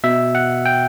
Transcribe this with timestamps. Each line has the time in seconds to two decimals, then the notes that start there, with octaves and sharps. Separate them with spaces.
0.04 B2 E5
0.35 F#5
0.66 G5